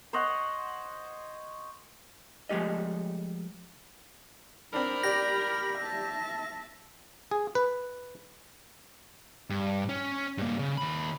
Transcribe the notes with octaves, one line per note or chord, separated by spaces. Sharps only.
C5 C#5 D#5 F#5
F3 G#3 A3 G4 D#5
C4 D4 A#4 B5
G4 D5 A#6
E5 A5
G#4
B4
G2
C#4
G2 A#3
C#3
D#2 B5